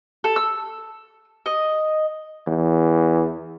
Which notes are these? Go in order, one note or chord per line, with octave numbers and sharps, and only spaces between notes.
A4
E6
D#5
E2